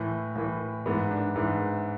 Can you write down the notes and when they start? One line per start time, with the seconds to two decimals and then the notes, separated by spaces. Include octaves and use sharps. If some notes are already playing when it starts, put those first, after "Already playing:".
Already playing: A2 E3
0.36 A2 E3
0.86 G#2 E3 B3
1.11 D4
1.36 G#2 E3